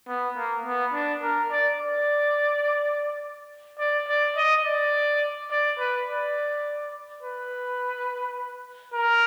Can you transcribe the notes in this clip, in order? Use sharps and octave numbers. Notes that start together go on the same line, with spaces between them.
B3
A#3
B3
D4
A#4
D5
D5
D5
D5
D#5
D5
D5
B4
D5
B4
A#4